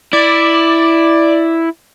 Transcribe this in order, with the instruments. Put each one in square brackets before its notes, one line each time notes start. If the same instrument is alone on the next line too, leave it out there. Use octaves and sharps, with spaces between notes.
[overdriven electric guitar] E4 [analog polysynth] D5